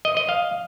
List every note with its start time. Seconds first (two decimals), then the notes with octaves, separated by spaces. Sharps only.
0.05 D#5
0.17 D#5
0.29 F5